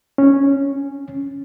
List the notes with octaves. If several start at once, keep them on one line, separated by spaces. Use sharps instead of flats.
C#4